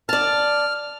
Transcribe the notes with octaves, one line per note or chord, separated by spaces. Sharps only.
D5 A5 F6